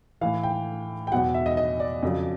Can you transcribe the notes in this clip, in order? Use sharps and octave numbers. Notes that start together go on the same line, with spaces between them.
A2 E3 F5
G5
G5
E2 B2 F#3 F#5
E5
D#5
D#5
D5
F2 C#3 F#3